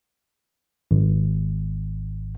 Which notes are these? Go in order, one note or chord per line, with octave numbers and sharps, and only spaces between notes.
G#1